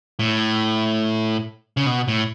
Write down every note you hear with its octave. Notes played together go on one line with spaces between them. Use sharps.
A2
C#3
B2
A2